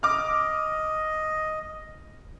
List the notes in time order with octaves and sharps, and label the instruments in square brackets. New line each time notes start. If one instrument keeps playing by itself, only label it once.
[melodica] D#5 [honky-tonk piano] D6 F6